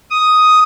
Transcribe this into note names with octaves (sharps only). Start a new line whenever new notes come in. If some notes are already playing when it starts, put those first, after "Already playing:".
D#6